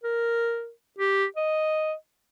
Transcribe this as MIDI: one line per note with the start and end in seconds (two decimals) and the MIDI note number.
0.03 0.70 70
0.98 1.25 67
1.36 1.94 75